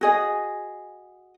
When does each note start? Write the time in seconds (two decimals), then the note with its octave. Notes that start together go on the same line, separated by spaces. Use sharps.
0.01 F#4 G#4 D#5